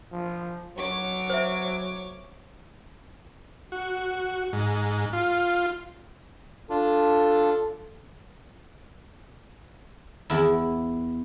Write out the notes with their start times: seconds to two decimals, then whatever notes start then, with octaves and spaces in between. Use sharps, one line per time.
0.12 F3
0.77 F#3 C#5 D6
1.30 C5 E5
3.72 F#4
4.53 G#2
5.13 F4
6.70 D4 F4 A4
10.30 E2 E4